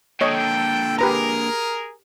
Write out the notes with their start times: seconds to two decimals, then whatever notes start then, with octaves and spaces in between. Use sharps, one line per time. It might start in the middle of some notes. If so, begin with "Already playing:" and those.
0.21 A#2 D3 A4 C#5 D#5 G5
0.99 G4 G#4 A#4 B4 A#5